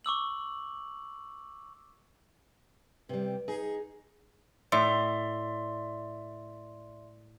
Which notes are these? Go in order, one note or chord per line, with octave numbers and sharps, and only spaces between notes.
C#6 D6 E6 F#7
C3 G3 B4
D#4 G#4
A2 D5 E5 C6